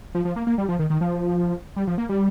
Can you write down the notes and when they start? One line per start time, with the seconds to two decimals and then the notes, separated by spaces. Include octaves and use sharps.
0.15 F3
0.25 F3
0.36 A#3
0.47 A#3
0.58 G3
0.69 F3
0.79 D#3
0.90 D#3
1.01 F3
1.76 G3
1.87 F3
1.98 A#3
2.09 G3